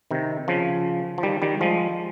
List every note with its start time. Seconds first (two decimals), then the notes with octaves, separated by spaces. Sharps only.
0.11 C3 D#3
0.48 C#3 F3
1.18 F3
1.23 D#3 G3
1.42 D#3 G3
1.61 F3 G#3